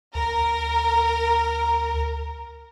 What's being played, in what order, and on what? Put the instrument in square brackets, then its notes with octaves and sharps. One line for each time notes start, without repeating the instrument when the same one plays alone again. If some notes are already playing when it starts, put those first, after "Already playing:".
[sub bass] D2 [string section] A#4